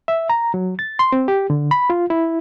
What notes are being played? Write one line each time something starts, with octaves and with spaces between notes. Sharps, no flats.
E5
A#5
F#3
A6
C6
C4
G4
D3
B5
F4
E4